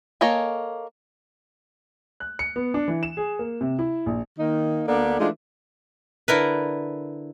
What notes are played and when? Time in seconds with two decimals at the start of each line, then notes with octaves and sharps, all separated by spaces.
0.21 A#3 A4 C#5 D#5 G#5
2.20 F#6
2.39 C#7
2.56 B3
2.74 D4
2.88 E3
3.03 E7
3.17 G#4
3.39 A#3
3.61 C3
3.79 E4
4.06 A#1
4.39 D#3 A#3 D#4
4.87 D2 A#3 B3 D4 A4 D5
5.20 E3 G#3 A3 D4 D#4 F4
6.28 D3 E4 A#4 B4